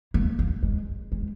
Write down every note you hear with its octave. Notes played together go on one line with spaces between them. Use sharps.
A#3
A#3
G#3
G#3